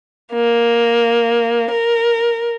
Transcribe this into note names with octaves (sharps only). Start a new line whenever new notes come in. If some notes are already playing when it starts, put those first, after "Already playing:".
A#3
A#4